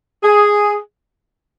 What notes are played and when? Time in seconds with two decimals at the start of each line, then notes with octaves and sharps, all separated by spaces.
0.23 G#4